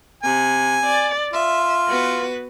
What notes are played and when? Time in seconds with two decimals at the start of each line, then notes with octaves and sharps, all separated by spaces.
0.23 C3 G#5
0.87 D5 A6
1.33 F4 E5
1.88 B3 F#4 B4